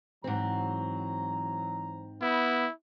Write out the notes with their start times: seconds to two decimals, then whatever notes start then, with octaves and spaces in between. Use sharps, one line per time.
0.24 G#2 E3 F#3 C4 A#5
2.21 B3 E4